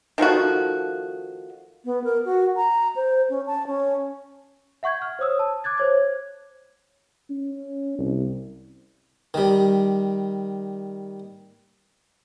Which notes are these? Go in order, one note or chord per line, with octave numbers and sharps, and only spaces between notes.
D#3 F3 A3 F#4
B3
A#4
F#4
A#5
C5
C#4
A5
C#4
E5 F#5 C#6 G6 G#6
F6
C5 C#5 D#6 E6
A5
D6 F#6 G#6 A6
C5 C#5 G#6
C#4
C2
D#3 G3